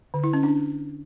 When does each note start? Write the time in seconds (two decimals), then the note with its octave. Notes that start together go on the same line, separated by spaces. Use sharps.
0.14 D3
0.24 E4
0.33 C#4
0.43 D4